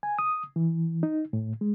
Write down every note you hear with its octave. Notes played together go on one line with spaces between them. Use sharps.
G#5
D#6
E3
D#4
A2
G#3